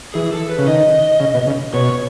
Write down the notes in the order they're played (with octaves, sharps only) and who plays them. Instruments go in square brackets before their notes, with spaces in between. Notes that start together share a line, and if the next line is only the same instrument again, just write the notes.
[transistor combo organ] E3 [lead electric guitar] G#4
[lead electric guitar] A4
B4
[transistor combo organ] C#3
[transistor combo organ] D#3 [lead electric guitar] D#5
[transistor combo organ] C#3
B2
C#3
[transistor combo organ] B2 [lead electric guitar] C#5